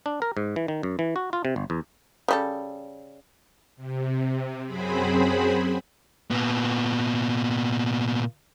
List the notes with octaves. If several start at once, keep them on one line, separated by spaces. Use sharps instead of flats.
D4
A#4
G#2
E3
D#3
F#2
E3
F#4
F4
C3
G1
E2
C#3 G3 A4
C3
F#2 F#3 C4 G#4 C5 B5
A#2 B3